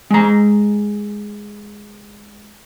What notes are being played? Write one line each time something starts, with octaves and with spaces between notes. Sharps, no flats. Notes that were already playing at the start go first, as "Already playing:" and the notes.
G#3 A#5